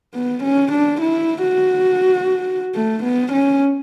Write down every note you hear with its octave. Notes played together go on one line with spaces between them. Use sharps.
B3
C#4
D4
E4
F#4
A3
B3
C#4